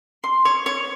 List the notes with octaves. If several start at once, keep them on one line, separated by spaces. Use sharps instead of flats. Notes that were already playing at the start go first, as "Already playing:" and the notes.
C6
C#5
C#5